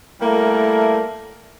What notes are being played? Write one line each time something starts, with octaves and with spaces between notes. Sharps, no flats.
G3 A3 A#3 E4 A#4